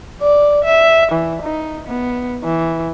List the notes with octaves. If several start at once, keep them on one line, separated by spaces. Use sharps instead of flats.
D5
E5
E3
D#4
B3
E3